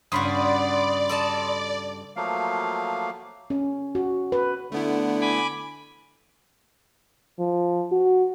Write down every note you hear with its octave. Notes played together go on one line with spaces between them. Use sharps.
G2 C#3 F#4 D5 B5 C6 D#6
A4 D#5 A5
F3 F#3 A3 A#3 F5
C#4
F#4
B4
D3 A3 B3 E4
G#5 B5 D6
F3
F#4